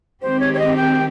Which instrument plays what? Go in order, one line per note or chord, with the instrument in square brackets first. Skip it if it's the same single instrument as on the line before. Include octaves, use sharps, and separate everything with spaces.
[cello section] D#3 G#3 C4 G4 [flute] C5
[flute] C#5
C#5
D#5
G5